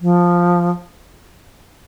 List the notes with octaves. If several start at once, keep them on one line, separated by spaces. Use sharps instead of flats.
F3